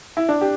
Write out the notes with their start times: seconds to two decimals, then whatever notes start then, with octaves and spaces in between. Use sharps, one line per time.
0.17 E4
0.29 D4
0.41 G4